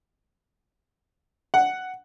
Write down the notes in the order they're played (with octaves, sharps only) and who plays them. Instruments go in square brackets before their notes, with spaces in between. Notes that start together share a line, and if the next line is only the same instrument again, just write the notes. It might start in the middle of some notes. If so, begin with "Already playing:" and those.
[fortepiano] F#5